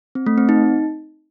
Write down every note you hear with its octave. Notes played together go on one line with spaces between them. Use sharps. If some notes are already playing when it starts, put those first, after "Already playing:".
C4
A3
C4
D#4